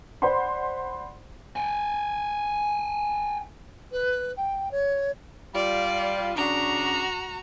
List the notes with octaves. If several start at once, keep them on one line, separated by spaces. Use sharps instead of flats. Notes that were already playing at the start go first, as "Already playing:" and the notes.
C5 D5 F#5 B5 C6
G5 G#5
B4
G5
C#5
G3 F4 D5
C#3 D4 F#4 A#5